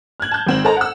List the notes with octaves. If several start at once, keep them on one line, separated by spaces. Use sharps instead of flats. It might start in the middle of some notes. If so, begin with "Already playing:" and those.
F6 F#6 G#6 F#7
A5 G6
G#1 C4 F#7
A4 A#4 C5 D#5 A5 A#5
F#5 E6